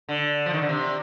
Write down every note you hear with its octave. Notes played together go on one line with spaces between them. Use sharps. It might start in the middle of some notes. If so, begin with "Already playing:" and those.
D3
F3
D#3
D3
C3